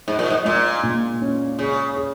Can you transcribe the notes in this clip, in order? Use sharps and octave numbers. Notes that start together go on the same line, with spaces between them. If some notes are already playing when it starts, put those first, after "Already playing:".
G#2 G#3
A#2
G#2
A#2 G#3
A#2
C#4
C#3 G#4
G#4